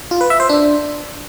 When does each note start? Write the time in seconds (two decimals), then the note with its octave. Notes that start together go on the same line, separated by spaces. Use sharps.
0.11 F4
0.21 B4
0.30 E5
0.40 C5
0.49 D4